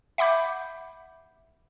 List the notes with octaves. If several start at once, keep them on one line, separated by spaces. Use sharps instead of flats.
E5 F#5 B5 D6 G6